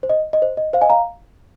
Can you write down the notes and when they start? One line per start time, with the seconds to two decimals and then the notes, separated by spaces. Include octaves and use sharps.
0.03 C5
0.09 D#5
0.33 D#5
0.42 C5
0.57 D#5
0.73 C5 F5
0.81 D#5 G#5
0.90 F5 A#5